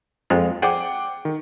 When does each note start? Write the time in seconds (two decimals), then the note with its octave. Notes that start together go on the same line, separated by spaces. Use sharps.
0.30 F2 G#3 F4
0.62 G#4 C5 D5 F#5 G5 D6
1.25 D#3